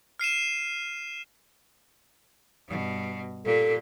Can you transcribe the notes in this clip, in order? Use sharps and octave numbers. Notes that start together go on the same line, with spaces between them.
F6 C7 D#7 E7
G2 B2
A#2 G4 A4